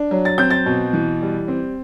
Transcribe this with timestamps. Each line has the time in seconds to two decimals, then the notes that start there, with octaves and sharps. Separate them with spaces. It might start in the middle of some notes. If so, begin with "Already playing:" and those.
Already playing: D4
0.11 F#3
0.25 A6
0.38 C4 G6
0.50 A6
0.66 B2
0.93 E3
1.21 G3
1.48 C4